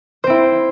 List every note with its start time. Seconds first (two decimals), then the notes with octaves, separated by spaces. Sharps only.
0.24 C5
0.27 C4
0.30 E4